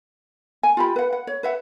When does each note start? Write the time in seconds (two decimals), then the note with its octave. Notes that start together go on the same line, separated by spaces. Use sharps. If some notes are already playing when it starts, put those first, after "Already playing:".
0.63 G#5
0.77 F4 G4 B5
0.96 B4 F#5
1.13 F#5
1.27 C#5
1.43 B4 E5 F#5